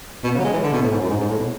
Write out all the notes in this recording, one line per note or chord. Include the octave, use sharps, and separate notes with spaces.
B2
C#3
F#3
G#3
E3
D3
B2
A2
G#2
F#2
G#2
G#2
A2
B2